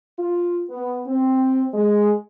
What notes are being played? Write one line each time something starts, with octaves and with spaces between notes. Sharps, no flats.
F4
B3
C4
G#3